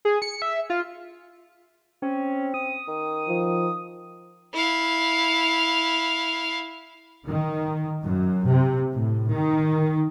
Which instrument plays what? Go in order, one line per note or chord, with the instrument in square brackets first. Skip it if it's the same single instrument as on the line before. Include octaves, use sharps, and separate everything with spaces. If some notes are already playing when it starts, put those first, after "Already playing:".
[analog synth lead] G#4
C#7
E5
F4
[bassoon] C4 [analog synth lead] C#4
[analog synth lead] D#6
[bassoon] D#3
[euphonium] F3
[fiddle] E4 F5
[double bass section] D#3
F#2
C3
A2
D#3